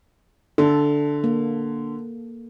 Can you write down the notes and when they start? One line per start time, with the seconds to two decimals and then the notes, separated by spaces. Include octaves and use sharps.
0.58 D3 A4
1.24 A#3